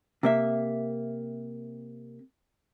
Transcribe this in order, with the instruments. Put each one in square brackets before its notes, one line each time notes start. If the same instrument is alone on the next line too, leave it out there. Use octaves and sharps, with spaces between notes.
[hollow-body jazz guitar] C3 A#3 E5